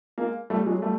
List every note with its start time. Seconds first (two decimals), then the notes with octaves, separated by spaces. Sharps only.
0.18 G#3 A#3
0.50 G3 A3
0.66 F#3 G#3
0.82 G3 A3